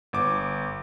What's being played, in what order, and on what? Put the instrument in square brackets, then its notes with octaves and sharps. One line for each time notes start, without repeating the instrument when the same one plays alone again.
[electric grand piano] G1 D6